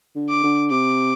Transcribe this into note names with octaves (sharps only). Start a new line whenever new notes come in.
D3
D6
D3
C3 D6